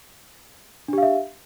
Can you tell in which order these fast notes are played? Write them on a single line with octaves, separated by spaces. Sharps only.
D4 G4 F5 E5